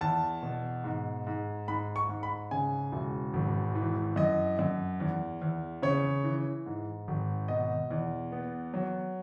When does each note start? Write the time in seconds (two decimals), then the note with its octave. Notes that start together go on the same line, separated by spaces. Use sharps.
0.01 E2 A5
0.42 B2
0.84 G#2
1.27 G#2
1.68 G#2 B5
1.96 C#6
2.09 G#2
2.23 B5
2.51 C#3 G#5
2.92 E1
3.34 G#1
3.75 E3
4.16 F#2 D#5
4.59 F#2
5.00 E2
5.42 E2
5.82 C#3 C#5
6.24 E3
6.66 G#2
7.08 G#1
7.48 B2 D#5
7.91 E2
8.32 B3
8.74 F#3